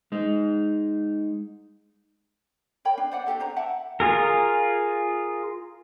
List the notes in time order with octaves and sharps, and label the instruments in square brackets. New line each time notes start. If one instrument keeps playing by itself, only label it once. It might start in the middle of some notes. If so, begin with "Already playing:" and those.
[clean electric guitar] G#3 D#4
[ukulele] A#4 C#5 G5 B5
D4
C5 D5 F#5
D4 F4 G4 A4
D4 C5 A#5
E5 F#5 G5 A5
[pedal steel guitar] F4 G#4 A#4